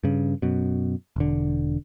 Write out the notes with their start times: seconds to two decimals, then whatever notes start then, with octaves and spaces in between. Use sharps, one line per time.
0.04 G2 C#3
0.42 F#2 B2
1.16 E1 D3